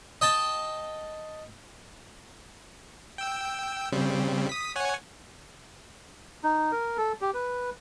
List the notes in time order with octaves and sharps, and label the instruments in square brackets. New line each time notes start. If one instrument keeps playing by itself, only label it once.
[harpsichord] D#5 G5 A5
[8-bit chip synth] G5 E6
C#3 G3 C4
D#6 B6
C#5 F#5 G#5
[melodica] D#4
A#4
A4
G4
B4